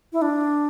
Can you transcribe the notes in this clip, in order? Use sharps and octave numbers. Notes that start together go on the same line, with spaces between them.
E4
D4